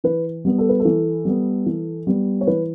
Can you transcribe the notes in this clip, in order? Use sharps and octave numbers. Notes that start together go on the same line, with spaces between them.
E3 B4
G3 B3
A4
B4
A4
E3
G3 B3
E3
G3 B3
C#5
E3 B4